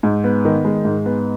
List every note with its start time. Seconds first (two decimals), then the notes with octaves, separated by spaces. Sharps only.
0.03 G#2
0.24 B3
0.45 D#3
0.65 G#3
0.85 G#2
1.06 B3